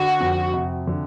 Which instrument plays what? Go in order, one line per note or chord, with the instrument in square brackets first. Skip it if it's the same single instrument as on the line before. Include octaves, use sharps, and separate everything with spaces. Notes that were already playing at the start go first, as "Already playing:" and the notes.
Already playing: [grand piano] D3 [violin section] F#4
[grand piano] F2
C3
D3